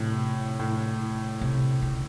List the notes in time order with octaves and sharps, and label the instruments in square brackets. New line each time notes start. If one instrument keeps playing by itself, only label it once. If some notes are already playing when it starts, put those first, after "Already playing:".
Already playing: [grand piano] A2 [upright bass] C3
[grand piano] A2
[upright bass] C3
C#3